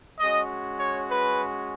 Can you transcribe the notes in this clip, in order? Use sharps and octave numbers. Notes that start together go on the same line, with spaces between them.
G#3 C#4 F#4 D#5
C#5
B4